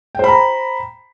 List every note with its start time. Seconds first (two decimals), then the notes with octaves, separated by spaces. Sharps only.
0.15 G5
0.19 C5
0.24 B5
0.28 A#5